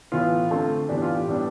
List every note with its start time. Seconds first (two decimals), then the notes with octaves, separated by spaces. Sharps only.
0.12 A2 E3 B3 F4
0.51 D3 A3 C4
0.89 A2 E3 B3 D4 G4
1.02 F4
1.15 G4
1.28 A2 G3 B3 D4